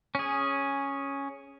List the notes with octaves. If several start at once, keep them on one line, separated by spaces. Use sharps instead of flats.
C#4 G#4